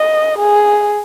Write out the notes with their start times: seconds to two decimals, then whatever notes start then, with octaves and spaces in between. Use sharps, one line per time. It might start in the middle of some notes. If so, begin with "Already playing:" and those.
Already playing: D#5
0.39 G#4